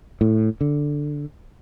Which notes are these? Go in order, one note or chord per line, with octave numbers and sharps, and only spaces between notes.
A2
D3